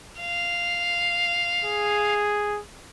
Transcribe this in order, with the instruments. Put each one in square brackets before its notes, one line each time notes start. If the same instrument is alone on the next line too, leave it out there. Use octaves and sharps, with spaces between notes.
[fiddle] F5
[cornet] G#4